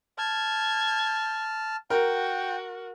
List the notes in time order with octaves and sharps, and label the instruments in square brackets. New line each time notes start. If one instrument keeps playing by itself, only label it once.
[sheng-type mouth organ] A5 F6 [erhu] G#6
[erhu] F#4 [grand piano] A#4 [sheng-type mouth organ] G5